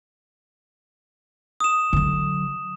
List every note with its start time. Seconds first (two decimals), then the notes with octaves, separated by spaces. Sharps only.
1.60 D#6 E7
1.93 D3 F#3